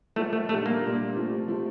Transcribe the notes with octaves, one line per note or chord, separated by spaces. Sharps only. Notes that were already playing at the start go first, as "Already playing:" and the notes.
F3 A3 A#3 D#4
A3
A#2 G3 A3 D4
A#3
A#2 G3 D4
C3 F3 A3
C3 F3 A3